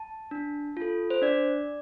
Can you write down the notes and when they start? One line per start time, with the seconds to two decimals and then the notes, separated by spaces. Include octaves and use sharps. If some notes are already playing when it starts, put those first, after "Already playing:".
Already playing: A5
0.31 D4
0.77 F4 A4
1.10 C5
1.22 D4 D5